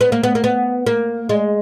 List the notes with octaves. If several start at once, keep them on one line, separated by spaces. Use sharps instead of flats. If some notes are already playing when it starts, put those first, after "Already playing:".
B3
A#3
B3
A#3
B3
A#3
G#3